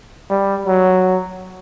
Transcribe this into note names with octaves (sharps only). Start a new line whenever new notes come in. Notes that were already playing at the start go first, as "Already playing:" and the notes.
G3
F#3